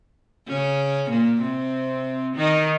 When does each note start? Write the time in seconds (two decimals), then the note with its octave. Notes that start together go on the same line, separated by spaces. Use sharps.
0.48 C#3 C#4
1.10 A#2 A#3
1.42 C3 C4
2.36 D#3 D#4